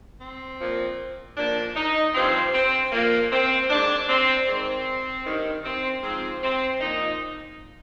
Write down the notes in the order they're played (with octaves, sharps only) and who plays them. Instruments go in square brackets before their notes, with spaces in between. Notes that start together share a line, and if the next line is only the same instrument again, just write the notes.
[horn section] C4
A#2 F3
A#2 F3 D4
D#4
G2 F3 C4
C4
A#2 F3 A#3
C4
G#2 D#3 D4
C4
G#2 D#3 C4
G2 D#3
C4
G#2 F3 C4
C4
A#2 F3 D#4